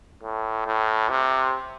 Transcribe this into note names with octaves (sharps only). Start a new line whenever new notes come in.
A2
A2
C3